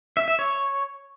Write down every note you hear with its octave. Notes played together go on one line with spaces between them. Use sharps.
E5
E5
C#5